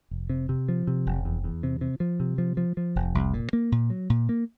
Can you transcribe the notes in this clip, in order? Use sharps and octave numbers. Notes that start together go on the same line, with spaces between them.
F1
C3
C3
F3
C3
F1
E2
E2
C3
C3
F3
C3
F3
F3
F3
F1
C2
A#2
A#3
A#2
F#3
A#2
A#3